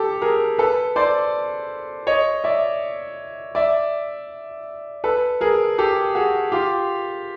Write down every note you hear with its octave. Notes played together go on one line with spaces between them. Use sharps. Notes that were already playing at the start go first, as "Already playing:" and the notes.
Already playing: G4 A4
G#4 A#4
A4 B4
C5 D5
C#5 D#5
D5 E5
D5 E5
A4 B4
G#4 A#4
G4 A4
F#4 G#4
F4 G4